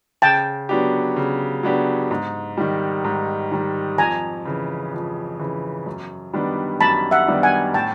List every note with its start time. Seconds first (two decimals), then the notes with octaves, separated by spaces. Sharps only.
0.22 C#3 G5 A5
0.69 F#3 B3 D4 G4
1.16 C#3
1.63 F#3 B3 D4 G4
2.11 G#2
2.57 D#3 G3
3.04 G#2
3.51 D#3 G3
3.98 F2 G#5 A#5
4.45 C#3 E3
4.93 F2
5.39 C#3 E3
5.86 F#2
6.34 D#3 G3 B3 D4
6.81 F#2 A5 B5
7.11 E5 F#5
7.28 D#3 G3 B3 D4
7.43 F#5 G#5
7.74 A2 G5 A5